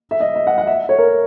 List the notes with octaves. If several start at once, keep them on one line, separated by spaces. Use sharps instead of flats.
E5
D#5
E5
F#5
F#5
E5
C#5
A#4